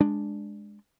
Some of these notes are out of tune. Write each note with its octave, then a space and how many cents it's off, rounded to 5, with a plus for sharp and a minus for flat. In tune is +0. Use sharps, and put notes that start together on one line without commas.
G#3 +0 D4 +0